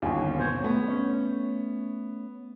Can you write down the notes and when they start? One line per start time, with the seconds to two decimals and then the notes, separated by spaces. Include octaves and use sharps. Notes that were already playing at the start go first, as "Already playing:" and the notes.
0.02 G1 D#2 C#4 G#4
0.39 B2 C4 C5 C#5
0.64 A3 B3
0.88 C#4